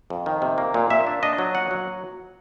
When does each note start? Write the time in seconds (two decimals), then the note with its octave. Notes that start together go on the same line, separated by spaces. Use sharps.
0.10 F2
0.26 D#3
0.42 C3
0.58 A#3
0.74 A#2
0.90 A#2 E5
1.07 D4
1.23 D4 D#5
1.38 F#3
1.55 A#2 F#5
1.71 F#3